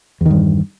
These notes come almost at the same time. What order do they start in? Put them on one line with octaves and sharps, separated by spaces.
E2 D#3 G2